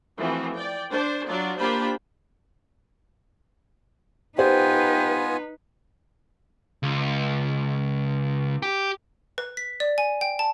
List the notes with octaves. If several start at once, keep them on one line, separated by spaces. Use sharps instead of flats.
E3 F3 A3 C4 F#4
D5 G5
D4 C5
F#3 D4 F4 D5
A#3 D4 F4 G4 C5 B5
B3 D#4 F4 G4 B4 C5 G5 G#5
C#2
G4
B4
B6
D5
G#5
G5
A5